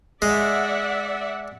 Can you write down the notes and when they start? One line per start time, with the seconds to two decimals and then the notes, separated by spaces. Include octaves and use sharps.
0.22 G#3 D5 E5 F#5